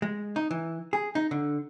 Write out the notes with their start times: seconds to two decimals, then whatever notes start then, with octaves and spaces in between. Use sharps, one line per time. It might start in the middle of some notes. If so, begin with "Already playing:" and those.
0.02 G#3
0.36 D#4
0.51 E3
0.93 G#4
1.15 D#4
1.31 D3